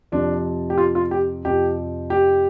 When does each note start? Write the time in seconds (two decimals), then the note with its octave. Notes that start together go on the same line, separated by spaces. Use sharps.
0.12 F2 C3 F3 D4
0.70 G4
0.78 F4
0.95 F4
1.11 G4
1.45 F2 C3 F3 G4
2.10 G4